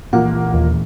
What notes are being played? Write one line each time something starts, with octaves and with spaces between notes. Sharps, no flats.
A#2 E3 F3 A#3 F#5
D#2